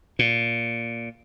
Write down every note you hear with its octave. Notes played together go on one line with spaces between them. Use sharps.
A#2